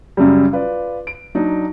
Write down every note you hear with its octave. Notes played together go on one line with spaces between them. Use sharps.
F#2 C#3 F#3 G3
F4 B4 D5
D7
F#3 D4 D#4